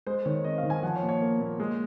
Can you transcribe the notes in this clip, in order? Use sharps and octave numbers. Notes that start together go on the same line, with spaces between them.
G#3 C5
D#3 C#5
C4 D#5
F5
D#3
G#5
F3 F#5
C#5
A#2
C#5
A#3
A#2
G#3